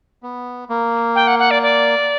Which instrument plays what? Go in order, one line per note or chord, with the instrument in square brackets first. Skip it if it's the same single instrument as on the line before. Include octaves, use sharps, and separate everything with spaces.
[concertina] B3
A#3
[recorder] G5
F#5
F#5
D5
D5